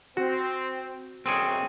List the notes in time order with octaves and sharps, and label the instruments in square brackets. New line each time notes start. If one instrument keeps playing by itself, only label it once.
[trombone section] C4 [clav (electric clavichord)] F#4
[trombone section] B1 F#2 [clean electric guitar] C4 G#4 C#5